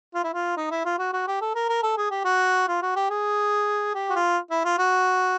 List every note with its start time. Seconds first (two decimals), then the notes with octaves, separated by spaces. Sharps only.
0.14 F4
0.24 E4
0.33 F4
0.57 D#4
0.71 E4
0.85 F4
0.99 F#4
1.13 F#4
1.27 G4
1.41 A4
1.55 A#4
1.69 A#4
1.83 A4
1.97 G#4
2.11 G4
2.25 F#4
2.68 F4
2.82 F#4
2.96 G4
3.10 G#4
3.95 G4
4.10 F#4
4.15 F4
4.51 E4
4.65 F4
4.78 F#4